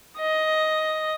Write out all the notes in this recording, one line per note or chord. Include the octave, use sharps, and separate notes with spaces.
D#5